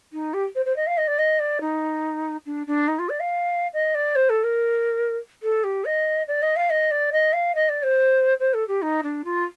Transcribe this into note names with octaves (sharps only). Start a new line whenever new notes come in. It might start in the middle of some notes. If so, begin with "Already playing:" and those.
D#4
G4
C5
C5
D#5
F5
D#5
D5
D#5
D5
D#4
D4
D4
D#4
F4
D5
F5
D#5
D5
C5
A4
A#4
A4
G4
D#5
D5
D#5
F5
D#5
D5
D#5
F5
D#5
D5
C5
C5
A4
G4
D#4
D4
F4